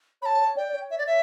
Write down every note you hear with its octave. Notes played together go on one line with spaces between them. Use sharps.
C#5 A5 B5
C#5
D5 G5
D5
C#5
E5
D5
E5